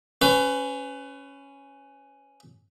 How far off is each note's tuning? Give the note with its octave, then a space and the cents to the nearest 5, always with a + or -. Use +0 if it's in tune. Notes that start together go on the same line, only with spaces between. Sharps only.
C#4 +0 B4 +30